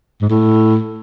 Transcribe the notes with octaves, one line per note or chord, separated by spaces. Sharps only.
G#2
A2